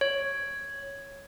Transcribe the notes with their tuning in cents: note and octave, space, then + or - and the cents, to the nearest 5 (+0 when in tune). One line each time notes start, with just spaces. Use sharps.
C#5 +0